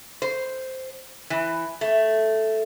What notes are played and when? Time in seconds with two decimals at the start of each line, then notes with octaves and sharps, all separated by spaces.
0.22 C5
1.30 E3
1.81 A3